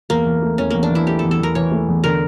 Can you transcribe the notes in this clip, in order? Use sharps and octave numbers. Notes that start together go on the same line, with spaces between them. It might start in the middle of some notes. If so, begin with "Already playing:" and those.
E2 A#3
E3
A3
E2 C#4
E2 A#3
D4
E3 E4
A3 G4
E2 A4
A4
E2 A#4
E3 C#5
A3
E2
D3 A#4